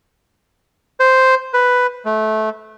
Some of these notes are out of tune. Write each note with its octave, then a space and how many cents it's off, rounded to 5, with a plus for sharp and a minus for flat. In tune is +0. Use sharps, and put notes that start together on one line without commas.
C5 -5
B4 +5
A3 -20